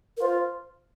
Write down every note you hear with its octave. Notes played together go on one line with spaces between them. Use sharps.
A#4
F4 C5